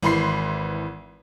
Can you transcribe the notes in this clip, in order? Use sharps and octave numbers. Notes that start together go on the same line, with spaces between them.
G#1 E3 B5 C6 C7